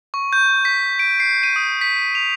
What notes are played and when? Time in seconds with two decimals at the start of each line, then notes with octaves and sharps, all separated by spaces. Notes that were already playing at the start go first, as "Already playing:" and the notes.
0.14 C#6
0.33 G6
0.65 B6
0.99 D7
1.20 C7
1.43 D#7
1.56 D#6
1.81 B6
2.15 F7